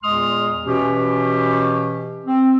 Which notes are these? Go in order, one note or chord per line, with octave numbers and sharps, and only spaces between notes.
E2 A#2 G#3 C6 D#6 F6
B2 E3 C#4 G4
C4